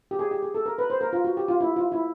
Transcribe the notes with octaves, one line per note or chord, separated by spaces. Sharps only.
G4
G#4
G4
G#4
A4
A#4
B4
C5
A#4
F4
F#4
G4
F4
E4
F4
E4